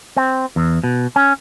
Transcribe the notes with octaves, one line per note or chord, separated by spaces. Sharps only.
C4
E2
B2
C#4